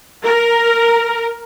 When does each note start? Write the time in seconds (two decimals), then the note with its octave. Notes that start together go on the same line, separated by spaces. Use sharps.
0.23 A#4